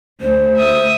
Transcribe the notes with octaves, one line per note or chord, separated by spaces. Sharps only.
D2 C5
E5 D#6